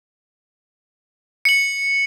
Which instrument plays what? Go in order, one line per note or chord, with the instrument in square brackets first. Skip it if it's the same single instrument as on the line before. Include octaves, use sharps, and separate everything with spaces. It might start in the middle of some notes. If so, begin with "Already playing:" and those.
[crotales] C#7 F#7